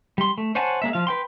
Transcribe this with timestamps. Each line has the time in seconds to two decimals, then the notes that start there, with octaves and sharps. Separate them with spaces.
0.18 G3 C6
0.38 A3
0.55 C5 C#5 F#5 G#5 A5
0.82 G#3 A#3 E5
0.93 F3 F5
1.07 B4 G5 C6